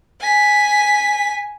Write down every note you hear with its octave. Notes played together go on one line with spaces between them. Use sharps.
G#5 B6